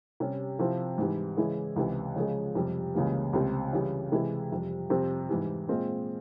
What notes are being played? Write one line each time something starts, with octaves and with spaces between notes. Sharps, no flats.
C3 G3 C#4
C3 F3 C4 E4
G#2 E3 G3
C#3 E3 G#3 E4
C#2 C3 E3
C#3 F3 G#3
F2 C3 G3
C#2 C#3 E3 G3 A#3
C#2 C3 G3 C4
C#3 E3 G3
C3 E3 G#3 E4
F2 C3 G3
F2 C3 G3 C4
G#2 E3 G3
A#2 G#3 C4 F4